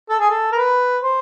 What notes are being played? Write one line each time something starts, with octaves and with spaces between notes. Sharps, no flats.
A4
G#4
A4
A#4
B4
C5